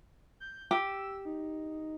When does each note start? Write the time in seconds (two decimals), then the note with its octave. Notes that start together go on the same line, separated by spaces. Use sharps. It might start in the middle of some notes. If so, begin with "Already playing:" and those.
0.40 G6
0.71 G4 E6
1.25 D#4